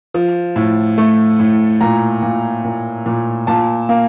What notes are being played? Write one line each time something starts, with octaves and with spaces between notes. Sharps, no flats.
F3
A2
A3
A2
A#2 A#5
A#2
A#2
A#2
A#2 A5
A#3